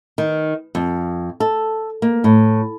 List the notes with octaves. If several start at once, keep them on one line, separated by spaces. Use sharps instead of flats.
D#3
F2
A4
A#3
A2